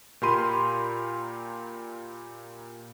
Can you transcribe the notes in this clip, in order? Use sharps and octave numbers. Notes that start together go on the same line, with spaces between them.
A#2 G4 A#4 B5 C6 D#7